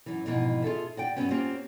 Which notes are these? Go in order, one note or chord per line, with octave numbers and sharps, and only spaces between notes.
F#2 E3
F2 G#2 B2 E3
F4 G#4 A4 E5
F#4 D5 G5
G2 F#3 B3 C#4
A#3 C4 C#4 F4 G4